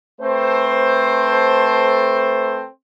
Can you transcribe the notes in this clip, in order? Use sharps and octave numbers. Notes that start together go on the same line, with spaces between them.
A3 C4 A4 B4 C5